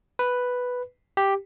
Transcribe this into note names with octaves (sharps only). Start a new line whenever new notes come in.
B4
G4